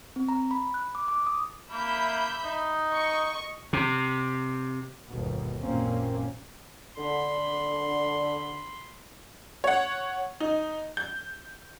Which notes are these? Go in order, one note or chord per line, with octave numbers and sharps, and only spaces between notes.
C4
A#5
B5
F#6
D6
D6
D#6
A#3 E5 B5 G6
D#4
D#5 C#6
C3
G1 D#2 B2
A1 F#2 A#2 A#3 C4 C#4
D3 B5 C6
C#5 F#5
D#4
G6